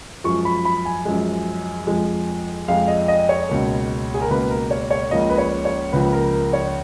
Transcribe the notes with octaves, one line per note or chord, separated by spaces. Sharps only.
F#2 F3 G#3 C#6
B5
B5
G#5
F#2 F3 G#3
F2 F3 G#3
F2 F3 G#3 F5
D#5
D#5
C#5
C#2 B2 A#3
G#4
A#4
C#2 B2 A#3 B4
A#4
C#5
C#5
C#2 C#3 F3 A#3 D#5
B4
C#5
C#5
C#2 C#3 F3 A#3 B4
A#4
A#4
C#5